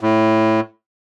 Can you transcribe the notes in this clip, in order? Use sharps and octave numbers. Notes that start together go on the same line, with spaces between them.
A2